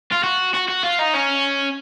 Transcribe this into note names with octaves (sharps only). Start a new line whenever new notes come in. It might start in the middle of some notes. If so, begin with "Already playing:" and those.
F4
F#4
F#4
F#4
F4
D#4
C#4